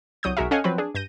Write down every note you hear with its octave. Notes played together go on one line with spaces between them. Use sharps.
C2 F#3 D#6 G6
B1 G#3 F#4 A#4 E5
C#4 A4 D#5 F5 F#5 G#5
F3 F#3 C4 B4
D4 G#4
G2 G6 A#6 D#7